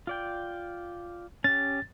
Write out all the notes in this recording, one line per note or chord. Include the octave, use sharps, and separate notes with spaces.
F4 D5 G5
C#4 G4 A6